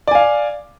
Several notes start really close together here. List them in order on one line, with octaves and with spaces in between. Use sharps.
D5 G#5 F5